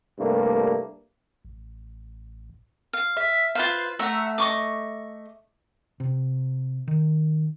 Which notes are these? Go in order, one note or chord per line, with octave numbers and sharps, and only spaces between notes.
C2 G2 A3 A#3
A1
F5
E5
F4 B4 C5 F5
A3 E5 F#5 A#5 E6
D#5 C#6 D6
C3
D#3